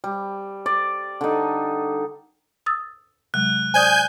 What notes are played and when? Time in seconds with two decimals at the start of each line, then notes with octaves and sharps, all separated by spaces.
0.04 G3
0.66 D5
1.21 D3 D#4
2.66 D#6 E6 A6
3.34 C3 F#3 G#3 F#6
3.74 C5 D5 G#5 D#6 G6